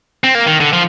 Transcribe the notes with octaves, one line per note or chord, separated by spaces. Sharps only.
C4
A#3
D#3
D3
F3